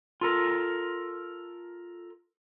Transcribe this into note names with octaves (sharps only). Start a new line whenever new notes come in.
F4 A4 A#4